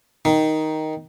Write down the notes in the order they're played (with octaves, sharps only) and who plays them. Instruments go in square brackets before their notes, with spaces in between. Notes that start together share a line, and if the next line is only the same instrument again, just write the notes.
[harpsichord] D#3